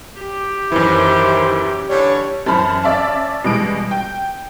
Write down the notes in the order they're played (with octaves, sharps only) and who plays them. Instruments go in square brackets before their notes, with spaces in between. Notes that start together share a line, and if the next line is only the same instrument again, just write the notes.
[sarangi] G4
[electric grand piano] F#2 E3 [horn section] D#3 C5 [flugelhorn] E4
[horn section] D3 E3 G3 [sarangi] C#5
[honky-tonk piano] F#2 E3 C5 A5 B5 F6
C#4 D5 E5 F5 A5
B2 E3 G3 G#3 D7
G5